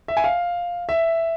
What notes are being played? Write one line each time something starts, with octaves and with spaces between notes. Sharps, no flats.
E5
G#5
F5
E5